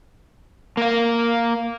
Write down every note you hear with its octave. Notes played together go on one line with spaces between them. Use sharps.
A#3 F5